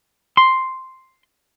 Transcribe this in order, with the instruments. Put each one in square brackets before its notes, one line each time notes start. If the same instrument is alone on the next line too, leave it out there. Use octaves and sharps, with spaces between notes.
[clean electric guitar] C6